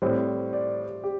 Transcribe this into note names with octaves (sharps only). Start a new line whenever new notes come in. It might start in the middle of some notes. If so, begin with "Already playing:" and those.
A2 G3 C4 C5
D5
G4